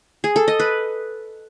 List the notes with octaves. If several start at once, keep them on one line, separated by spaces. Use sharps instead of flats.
G#4
A4
D#5
B4